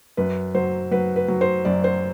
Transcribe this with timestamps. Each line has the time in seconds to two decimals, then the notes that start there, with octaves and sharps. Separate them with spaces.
0.17 F#2 B4
0.54 F#3 C5
0.91 F#3 B4
1.16 B4
1.28 F#3
1.41 C5
1.65 F#2 D5
1.84 C5